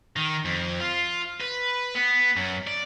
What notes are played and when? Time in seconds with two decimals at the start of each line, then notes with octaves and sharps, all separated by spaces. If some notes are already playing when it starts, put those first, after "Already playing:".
0.16 D#3
0.45 F2
0.80 F4
1.41 B4
1.95 B3
2.37 F#2
2.67 D5